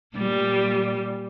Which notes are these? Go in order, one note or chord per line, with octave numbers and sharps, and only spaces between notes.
A#2 G3